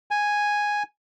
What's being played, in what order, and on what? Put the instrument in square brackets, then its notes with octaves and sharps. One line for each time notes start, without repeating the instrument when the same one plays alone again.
[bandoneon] G#5